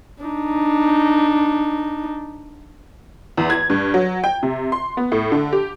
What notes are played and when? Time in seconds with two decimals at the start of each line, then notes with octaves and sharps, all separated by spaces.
0.23 D4 D#4
3.37 E2
3.50 G#6
3.70 G2
3.94 F#3
4.24 G5
4.43 C3
4.72 C6
4.97 B3
5.12 A2
5.32 D3
5.53 G4